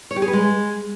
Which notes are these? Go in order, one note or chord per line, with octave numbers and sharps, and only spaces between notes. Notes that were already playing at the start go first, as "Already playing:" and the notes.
C#5
G4
G#4
B4
G#3